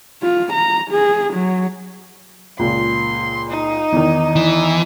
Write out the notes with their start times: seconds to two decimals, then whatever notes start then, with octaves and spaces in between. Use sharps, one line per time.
0.22 F4
0.53 A#5
0.91 G#4
1.33 F#3
2.59 C#2 A#2 C6
3.50 D#4
3.92 E2 D#3
4.36 E3